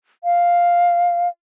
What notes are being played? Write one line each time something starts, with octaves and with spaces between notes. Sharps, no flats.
F5